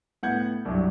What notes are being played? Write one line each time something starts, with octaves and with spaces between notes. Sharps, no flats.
A2 B3 F#5 G6 G#6
C2 G2 F#3